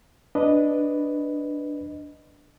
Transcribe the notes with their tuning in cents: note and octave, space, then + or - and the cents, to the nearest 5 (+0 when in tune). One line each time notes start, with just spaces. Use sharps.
D4 +0 B4 +0 D#5 +0